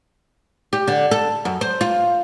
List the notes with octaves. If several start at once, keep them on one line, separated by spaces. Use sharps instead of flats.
G4
D3
A4
F#2
C5
F4